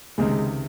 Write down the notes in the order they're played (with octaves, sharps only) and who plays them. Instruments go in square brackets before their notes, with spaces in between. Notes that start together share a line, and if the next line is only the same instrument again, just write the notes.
[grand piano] C#2 C3 D#3 [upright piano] G#3